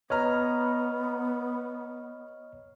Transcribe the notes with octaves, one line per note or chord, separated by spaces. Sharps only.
B3 B4 C#5 D#5 A#5 F6